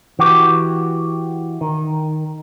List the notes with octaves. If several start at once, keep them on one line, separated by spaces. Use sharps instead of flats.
E3 F#4 G4
D#3